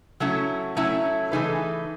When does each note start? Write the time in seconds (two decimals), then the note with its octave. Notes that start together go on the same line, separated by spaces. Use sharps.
0.20 F#3 A3 C#4 E4
0.76 F#3 A3 C#4 E4
1.31 E3 A3 D#4 G#4 B4